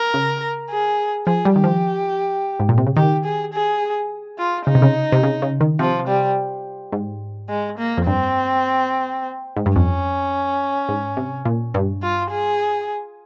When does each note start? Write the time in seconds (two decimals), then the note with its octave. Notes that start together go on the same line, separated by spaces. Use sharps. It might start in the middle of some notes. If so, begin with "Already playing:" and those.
Already playing: A#4
0.14 C#3
0.70 G#4
1.27 F3 G#4
1.45 G3
1.55 D#3 G4
1.64 F3
2.60 G#2
2.69 A#2
2.78 C3
2.87 C#3
2.97 D#3 G4
3.25 G#4
3.53 G#4
4.38 F4
4.66 C#3 D#4
4.75 C3
4.82 C#3
5.12 C3
5.23 C#3
5.42 C#3
5.61 D#3
5.79 C3 F3
6.08 G3
6.92 G#2
7.50 G#3
7.78 A#3
7.97 F2
8.06 G2 C4
9.57 G#2
9.66 G2
9.76 F2 C#4
10.89 G#2
11.17 C3
11.45 A#2
11.74 G2
12.03 F4
12.31 G#4